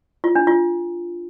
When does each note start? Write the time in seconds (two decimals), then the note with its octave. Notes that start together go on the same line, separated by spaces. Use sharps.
0.24 F4
0.35 D4
0.47 F4